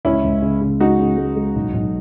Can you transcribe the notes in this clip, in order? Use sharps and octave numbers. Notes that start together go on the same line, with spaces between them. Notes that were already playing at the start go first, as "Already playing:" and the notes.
C#2 C#4 E4
C#2
C#3
C#3
G#3 D#4 F#4
C#3
G#3
G#3
B1
B1